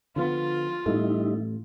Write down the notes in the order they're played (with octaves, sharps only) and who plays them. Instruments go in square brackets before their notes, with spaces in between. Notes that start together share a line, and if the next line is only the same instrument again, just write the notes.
[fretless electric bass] D3 F3 B3 [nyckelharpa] F4
[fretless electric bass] A1 A2 A3 [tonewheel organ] G3 D#4 E4